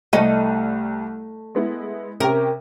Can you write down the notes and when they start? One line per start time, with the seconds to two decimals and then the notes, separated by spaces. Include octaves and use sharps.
0.13 C2 G3 A3 D#5 D#7
1.55 G#3 B3 E4
2.20 C3 C#4 G4 A#4